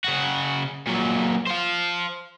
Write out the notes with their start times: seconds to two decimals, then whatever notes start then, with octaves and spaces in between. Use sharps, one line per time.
0.04 C#3 F#4
0.87 A#2 F#3
1.47 C5 F5